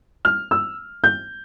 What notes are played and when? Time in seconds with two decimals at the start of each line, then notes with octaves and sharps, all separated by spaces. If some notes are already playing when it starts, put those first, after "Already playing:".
0.25 F6
0.51 E6
1.04 G6